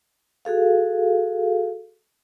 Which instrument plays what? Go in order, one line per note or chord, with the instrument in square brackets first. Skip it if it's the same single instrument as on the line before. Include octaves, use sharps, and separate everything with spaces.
[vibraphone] F#4 G#4 A4 F5